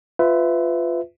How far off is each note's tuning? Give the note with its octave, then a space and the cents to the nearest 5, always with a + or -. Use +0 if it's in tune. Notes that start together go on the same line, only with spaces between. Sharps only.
F4 +0 B4 +25 E5 -5